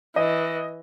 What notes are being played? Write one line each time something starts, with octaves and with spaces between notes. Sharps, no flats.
E3 D#5